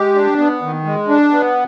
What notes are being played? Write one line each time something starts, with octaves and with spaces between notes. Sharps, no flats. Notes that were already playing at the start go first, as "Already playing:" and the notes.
Already playing: G#3 G4
D4
B3
D#3
G#3
D4
B3